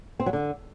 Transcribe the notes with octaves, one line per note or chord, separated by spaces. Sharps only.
C4
F#3
D3